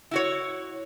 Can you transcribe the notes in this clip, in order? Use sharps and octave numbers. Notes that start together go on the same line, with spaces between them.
E4 F#4 C#5